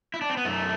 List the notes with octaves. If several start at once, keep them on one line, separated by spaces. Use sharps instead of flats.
E4
D4
C4
B3
F#2 A3